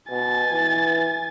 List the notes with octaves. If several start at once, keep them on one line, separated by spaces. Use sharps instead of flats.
B2 G#5 A6
E3